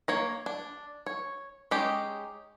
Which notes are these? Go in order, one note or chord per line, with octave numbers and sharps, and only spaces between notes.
A#3 C#5 A#5
D4
C#5
G#3 C#4 D#4 G4